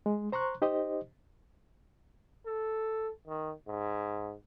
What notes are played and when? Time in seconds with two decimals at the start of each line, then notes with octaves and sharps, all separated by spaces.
0.06 G#3
0.32 C5 A#5 C6 C#6 F#6
0.62 D#4 G4 C5 D#5
2.46 A4
3.27 D#3
3.68 G#2